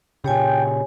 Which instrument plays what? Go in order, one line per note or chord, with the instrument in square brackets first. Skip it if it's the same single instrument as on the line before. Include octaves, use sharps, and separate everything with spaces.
[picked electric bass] A#2 C#3 [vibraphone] G4 C#5 G#5 [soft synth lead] G5